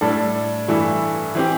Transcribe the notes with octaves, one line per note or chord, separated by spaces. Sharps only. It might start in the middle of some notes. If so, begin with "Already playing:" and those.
A2 G3 D4 A4
G2 E3 A3 E4
E3 C4 G4